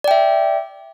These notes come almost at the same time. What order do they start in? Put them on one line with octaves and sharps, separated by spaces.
D5 G5 E5